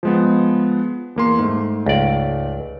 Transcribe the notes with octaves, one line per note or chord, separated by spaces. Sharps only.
F3 G#3 B3
E2 A#3 C6
G#2 A3
C#2 D5